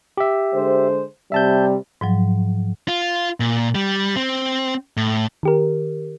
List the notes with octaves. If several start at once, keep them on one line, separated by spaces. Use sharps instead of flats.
G4 E5
D3 G#3 C5
C3 G3 E5 A5 G6
G#2 F3 F#3
F4
A#2
G3
C4
A2
D#3 G4 A#4